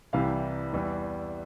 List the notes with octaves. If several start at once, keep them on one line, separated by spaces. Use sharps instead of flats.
C2 C3 E3 G3 F5
E2 E3 G3